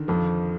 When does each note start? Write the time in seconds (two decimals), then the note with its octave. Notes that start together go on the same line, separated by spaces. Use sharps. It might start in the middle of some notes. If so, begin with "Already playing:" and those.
Already playing: D3 D#3
0.08 F2 F3